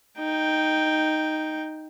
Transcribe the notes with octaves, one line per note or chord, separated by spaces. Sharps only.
D#4 G5